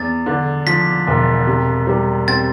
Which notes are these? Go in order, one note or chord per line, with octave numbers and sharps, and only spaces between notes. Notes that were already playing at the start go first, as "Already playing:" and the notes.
Already playing: E2 A6
D3
F3 B6
E1
C3
G3
C4 A6